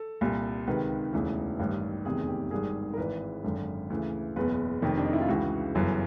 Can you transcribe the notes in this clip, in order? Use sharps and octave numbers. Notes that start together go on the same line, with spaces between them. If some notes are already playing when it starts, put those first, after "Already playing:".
Already playing: A4
C2 A#2
C#2 C3 D#3 B4
E1 D2 C#3 E3
A1 G2 D#3
F1 E2 C3 D#3 G#4
G4
G#1 G2 D#3 G#4
A#4
G#1 G#2 E3 B4
G#1 F#2 D3
D2 C#3 E3
F#1 E2 B2 B4
F1 F2 C3 D#3
D4
D#4
E4
F4
C#2 C#3 E3 F#4
G1 F#2 C#3 E3